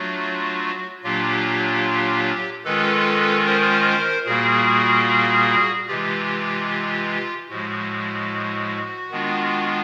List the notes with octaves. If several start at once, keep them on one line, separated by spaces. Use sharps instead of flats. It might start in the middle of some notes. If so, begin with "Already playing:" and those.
Already playing: F#3 A3 D4 F4 F#4
A#2 F#3 A#3 D4 F4 G4
D#3 G#3 C#4 F4 A4 B4
A#4 C5
A#2 G3 A#3 F#4 G#4
C3 E3 G#3 F4 G4
A2 F3 G#3 F#4
D#3 G#3 B3 D4 F4